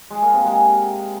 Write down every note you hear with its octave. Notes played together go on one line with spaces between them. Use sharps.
G#3
A#3
C3
G#3